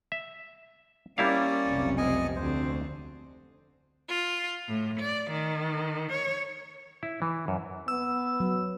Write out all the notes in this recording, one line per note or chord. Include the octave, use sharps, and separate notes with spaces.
E5
G3 A#3 C#4 E4 D5 F5
F1 B1 C3
B3 C4 D#5 G#5
D2 C4 D4 C5
F4
A2
D5
D#3
C#5
E4
E3
F#2
B3 E6
F#3